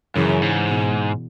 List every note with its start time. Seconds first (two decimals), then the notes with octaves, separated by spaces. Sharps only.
0.16 F#2 C#3 E3
0.42 G#2
0.68 B2